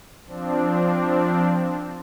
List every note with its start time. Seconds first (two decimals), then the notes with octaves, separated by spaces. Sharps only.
0.27 F3 C4 D4